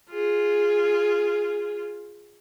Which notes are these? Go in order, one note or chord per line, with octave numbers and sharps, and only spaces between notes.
F4 G#4